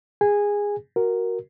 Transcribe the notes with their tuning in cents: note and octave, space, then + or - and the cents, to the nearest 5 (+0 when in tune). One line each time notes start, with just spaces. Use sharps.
G#4 -15 G#5 -15
F#4 +0 A#4 +0